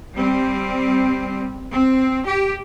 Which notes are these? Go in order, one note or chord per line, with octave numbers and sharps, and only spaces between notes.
G3 C4
C4
G4